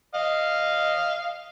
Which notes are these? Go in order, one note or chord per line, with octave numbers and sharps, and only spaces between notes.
D#5 F5